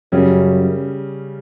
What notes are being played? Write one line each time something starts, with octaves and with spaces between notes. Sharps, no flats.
F#2 C#3 G3 C#4